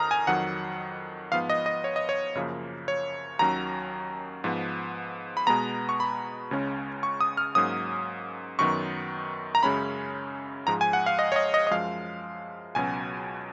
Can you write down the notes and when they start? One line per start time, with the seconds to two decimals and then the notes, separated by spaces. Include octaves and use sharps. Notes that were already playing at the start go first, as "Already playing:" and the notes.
Already playing: F2 D#3 A#5 D#6 F6
0.11 G#5
0.27 F2 D#3 F#3 F#5
1.32 G#2 F3 B3 F5
1.50 D#5
1.66 D#5
1.84 C#5
1.96 D#5
2.09 C#5
2.35 F#2 C#3 F3 A#3
2.88 C#5
3.39 D#2 D#3 F#3 C#4 A#5
4.44 G#2 F3 B3
5.37 B5
5.47 B2 G#3 B3 A#5
5.89 C#6
6.00 B5
6.51 C#2 C#3 G#3 C#4
7.03 C#6
7.21 D#6
7.37 F6
7.55 G#2 F#3 A#3 C#4 D#6
8.59 F#2 D#3 F#3 B3 C#6
9.55 A#5
9.63 F#2 C#3 G#3 C#4 B5
10.67 G#2 F3 G#3 A#5
10.81 G#5
10.93 F#5
11.06 F5
11.19 D#5
11.32 C#5
11.36 D#5
11.54 D#5
11.67 D#5
11.71 F#2 F3 G#3 F5
12.75 C#2 B2 F#3 C#4 G#5